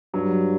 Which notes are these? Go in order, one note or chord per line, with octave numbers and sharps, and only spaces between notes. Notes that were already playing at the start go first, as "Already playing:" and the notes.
G2 F#3